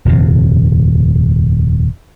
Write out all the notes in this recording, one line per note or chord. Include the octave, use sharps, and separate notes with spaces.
D#1 F2 C3